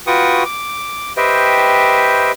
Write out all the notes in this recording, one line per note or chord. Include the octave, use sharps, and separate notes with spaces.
F4 F#4 B4 G5 C#6 D#6
D6
G4 B4 C5 D#5 E5 G5